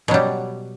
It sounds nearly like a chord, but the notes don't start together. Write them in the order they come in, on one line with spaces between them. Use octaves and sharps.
B2 F#3 G3